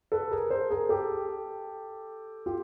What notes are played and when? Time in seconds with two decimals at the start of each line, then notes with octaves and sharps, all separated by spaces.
0.12 A4 B4
0.31 G#4 A#4
0.50 A#4 C5
0.70 G#4 A#4
0.89 G4 A4
2.46 F4 G4